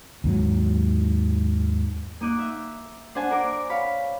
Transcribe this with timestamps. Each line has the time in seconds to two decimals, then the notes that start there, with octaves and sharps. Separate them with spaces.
0.24 D#2 G#2 F#3
2.21 A#3 D#4 D#5 D6 F#6
2.39 E5
3.15 D4 C5 F#5 G#5 A5
3.29 D4 A#4 D6
3.70 C#5 F5 B5